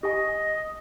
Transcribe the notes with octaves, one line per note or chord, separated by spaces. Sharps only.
G4 D#5 G#5